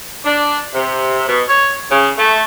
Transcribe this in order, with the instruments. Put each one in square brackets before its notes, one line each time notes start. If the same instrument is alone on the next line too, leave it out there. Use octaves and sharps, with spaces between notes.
[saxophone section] D4
C3
B2
C#5
C#3
A3